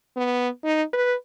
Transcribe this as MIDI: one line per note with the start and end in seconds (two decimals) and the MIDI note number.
0.17 0.49 59
0.64 0.83 63
0.93 1.14 71